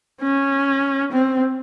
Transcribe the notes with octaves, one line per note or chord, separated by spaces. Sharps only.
C#4
C4